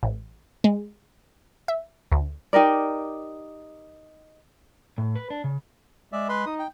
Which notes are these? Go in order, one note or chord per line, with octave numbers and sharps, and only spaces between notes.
A1
G#3
E5
D2
D#4 G4 A#4 D5
A2
B4
D4
C#3
G#3 D5 E5
B4 B5 C6
D#4 D#6
G5